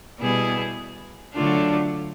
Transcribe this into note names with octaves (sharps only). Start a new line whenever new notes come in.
B2 G3 B3 E4 G#4
D3 F#3 A3 D4 F4